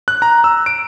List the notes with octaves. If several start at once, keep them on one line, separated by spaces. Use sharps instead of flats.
F#6
A#5
E6
D7